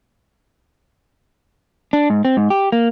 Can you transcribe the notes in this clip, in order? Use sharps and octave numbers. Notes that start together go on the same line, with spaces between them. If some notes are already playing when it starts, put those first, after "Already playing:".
D4
G#2
C4
G#2
G4
A#3